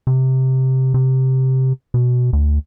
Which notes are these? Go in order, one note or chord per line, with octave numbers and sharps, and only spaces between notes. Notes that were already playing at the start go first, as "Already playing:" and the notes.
C3
C3
B2
D2